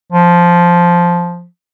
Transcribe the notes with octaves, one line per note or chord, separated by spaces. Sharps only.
F3